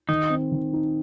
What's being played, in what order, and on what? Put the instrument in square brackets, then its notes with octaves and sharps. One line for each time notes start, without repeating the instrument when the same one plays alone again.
[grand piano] D#3 [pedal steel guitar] D#4
[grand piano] C4
D#3
D#4